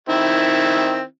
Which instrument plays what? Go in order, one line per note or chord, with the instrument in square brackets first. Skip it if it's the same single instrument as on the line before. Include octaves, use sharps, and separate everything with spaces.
[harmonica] D#3 C4 E4